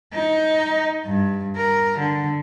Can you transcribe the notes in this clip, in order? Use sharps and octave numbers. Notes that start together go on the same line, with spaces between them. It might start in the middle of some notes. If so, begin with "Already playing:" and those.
D#4
G2
A#4
D3